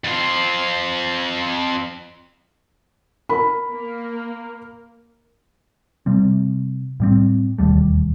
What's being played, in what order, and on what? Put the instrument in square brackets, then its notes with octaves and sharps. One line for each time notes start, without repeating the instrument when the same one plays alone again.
[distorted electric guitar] F2 F4
[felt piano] A#4 B5
[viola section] A#3
[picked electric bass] C3 G3 C4
A2 G3 C4
E1 D#2 G3 A3